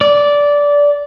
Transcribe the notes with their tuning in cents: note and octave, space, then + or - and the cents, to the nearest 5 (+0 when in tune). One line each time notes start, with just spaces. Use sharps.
D5 -15